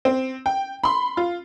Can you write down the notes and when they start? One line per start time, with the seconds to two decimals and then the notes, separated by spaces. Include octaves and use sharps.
0.05 C4
0.46 G5
0.84 B5 C6
1.17 F4